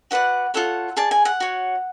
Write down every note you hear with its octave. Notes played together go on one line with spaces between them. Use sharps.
F#4 B4 D5 F#5
F4 A4 C#5 F#5
G#4 D5 A5
G#5
F#5
F#4 C#5